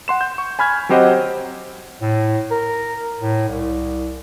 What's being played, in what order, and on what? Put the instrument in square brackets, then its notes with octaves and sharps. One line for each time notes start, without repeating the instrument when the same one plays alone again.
[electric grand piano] F#5 C6 E7
G6
C#6
G#5 B5 F6 G#6
F#3 C4 G4 C5 D#5 F#5
[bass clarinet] A2
A#4
A2
C2